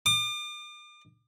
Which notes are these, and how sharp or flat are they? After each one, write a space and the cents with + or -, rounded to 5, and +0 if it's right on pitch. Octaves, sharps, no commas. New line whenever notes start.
D6 +40